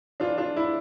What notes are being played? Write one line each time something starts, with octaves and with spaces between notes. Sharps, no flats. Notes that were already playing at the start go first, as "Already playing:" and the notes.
E3 D4 F4
D4 F4
E4